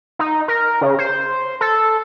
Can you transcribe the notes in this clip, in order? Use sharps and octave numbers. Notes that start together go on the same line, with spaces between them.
D#4
A#4
C#3
C5
A4